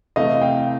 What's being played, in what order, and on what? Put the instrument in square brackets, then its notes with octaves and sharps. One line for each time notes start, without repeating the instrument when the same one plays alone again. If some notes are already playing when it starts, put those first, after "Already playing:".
[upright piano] C3 E3 A3 [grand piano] D#5 F5
[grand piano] F5 G5